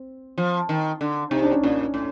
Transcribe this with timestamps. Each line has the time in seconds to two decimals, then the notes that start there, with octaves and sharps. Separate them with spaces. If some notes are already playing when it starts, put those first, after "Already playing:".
Already playing: C4
0.38 F3
0.69 D#3
1.01 D3
1.31 C3 D#4
1.42 D4
1.53 C#4
1.64 A#2 D4
1.94 A2